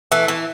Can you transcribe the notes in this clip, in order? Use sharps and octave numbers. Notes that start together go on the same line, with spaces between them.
E3 A3
E3